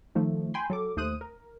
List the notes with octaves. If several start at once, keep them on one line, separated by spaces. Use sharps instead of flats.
D#3 F3 A3
G5 G#5 B5 C6
F#3 A4 D6
D#2 A3 C5 D#6 F#6 D#7
A#4